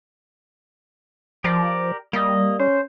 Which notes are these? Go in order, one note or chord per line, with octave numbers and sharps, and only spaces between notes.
F3 G4 A#4 D5
G3 A#3 D#5
C#4 C5